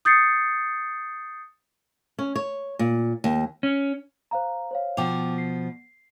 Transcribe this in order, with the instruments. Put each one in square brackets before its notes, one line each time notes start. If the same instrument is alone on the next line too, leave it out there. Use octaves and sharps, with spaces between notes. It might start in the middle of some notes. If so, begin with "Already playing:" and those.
[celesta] D#6 G6 A6 C7 C#7
[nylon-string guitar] C#4
C#5
A#2
D#2
[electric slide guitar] C#4
[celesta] C5 F5 A#5
C5 C#5 F5
[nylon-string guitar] B2 F3 [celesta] G5 D6 F7
[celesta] C7